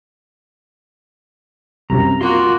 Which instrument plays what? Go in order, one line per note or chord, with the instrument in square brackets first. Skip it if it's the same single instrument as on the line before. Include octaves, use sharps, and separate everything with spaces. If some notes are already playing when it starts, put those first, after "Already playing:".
[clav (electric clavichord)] C2 F#2 C3 [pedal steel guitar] A#5
[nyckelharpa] A#3 F#4 [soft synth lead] F4 [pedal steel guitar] C6